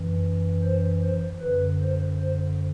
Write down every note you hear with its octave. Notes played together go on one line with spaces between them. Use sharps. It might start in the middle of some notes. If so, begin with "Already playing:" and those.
Already playing: F#2 E3
C5
C5
F#2 D3 B4
C5
C5